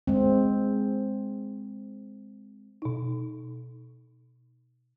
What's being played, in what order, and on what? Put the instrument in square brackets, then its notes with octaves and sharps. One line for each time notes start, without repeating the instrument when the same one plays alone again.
[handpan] G#3 C4
[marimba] B2 D#4